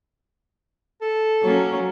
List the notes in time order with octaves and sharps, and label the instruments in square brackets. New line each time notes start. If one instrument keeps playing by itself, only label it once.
[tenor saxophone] A4
[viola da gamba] F#3 A#3 C#4